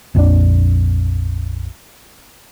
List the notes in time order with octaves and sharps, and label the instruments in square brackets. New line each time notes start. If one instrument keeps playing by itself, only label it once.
[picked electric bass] A#1 F2 D#3 D4